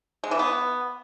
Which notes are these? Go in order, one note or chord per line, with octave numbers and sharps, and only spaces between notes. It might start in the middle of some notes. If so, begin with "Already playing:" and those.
G#3
E3
B3